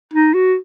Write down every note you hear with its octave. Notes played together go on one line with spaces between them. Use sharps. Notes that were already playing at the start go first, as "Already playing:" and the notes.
D#4
F#4